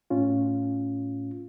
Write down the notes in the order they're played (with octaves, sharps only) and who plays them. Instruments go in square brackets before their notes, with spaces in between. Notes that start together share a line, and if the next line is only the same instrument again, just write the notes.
[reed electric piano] A2 C#4 F4